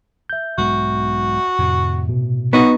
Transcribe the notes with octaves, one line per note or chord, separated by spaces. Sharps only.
E5 G6
B1 G#2 G#3 F#4
F2 A2 C3
B2
B3 D#4 F#4